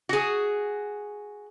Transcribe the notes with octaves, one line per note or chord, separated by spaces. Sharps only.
F#4 G#4